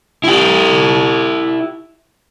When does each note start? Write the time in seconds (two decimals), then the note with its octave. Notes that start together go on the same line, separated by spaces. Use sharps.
0.24 E4 G4